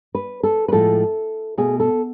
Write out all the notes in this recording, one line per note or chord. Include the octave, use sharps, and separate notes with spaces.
B4
A4
B4
A2 F3 G#3 A4
B2 A3 G#4
A4